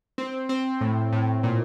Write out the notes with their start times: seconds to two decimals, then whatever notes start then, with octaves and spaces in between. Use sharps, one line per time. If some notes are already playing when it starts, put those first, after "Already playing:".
0.18 C4
0.49 C4
0.81 A2
1.13 A2
1.43 A#2